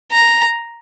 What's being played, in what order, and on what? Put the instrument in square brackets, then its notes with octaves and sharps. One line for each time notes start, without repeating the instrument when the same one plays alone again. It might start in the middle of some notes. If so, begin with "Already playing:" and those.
[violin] A#5